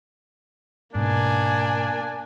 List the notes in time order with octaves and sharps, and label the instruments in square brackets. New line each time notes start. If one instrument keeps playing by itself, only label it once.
[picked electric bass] G#2 B2 [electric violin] A#3 G#5 [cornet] D4